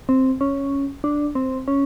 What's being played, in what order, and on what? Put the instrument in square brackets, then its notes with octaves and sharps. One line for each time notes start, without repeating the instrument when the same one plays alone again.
[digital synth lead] C4
C#4
D4
C4
C#4